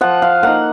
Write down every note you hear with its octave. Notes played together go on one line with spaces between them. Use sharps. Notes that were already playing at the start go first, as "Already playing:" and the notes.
F3 F#5
F5
A#3 D#4 F#5